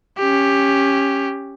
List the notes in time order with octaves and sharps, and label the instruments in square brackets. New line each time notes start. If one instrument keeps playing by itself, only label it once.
[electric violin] C#4 G4